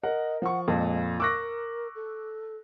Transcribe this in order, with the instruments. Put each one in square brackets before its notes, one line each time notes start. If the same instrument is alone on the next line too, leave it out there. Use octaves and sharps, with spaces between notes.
[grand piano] A#4 [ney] D#5 [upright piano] F#5
[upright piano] F3 C#6 [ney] F#5
[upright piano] F2 [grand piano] A#2 [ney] G#3
[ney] A#4 [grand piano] C#6 D6 [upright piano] E6 F#6 A#6
[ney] A4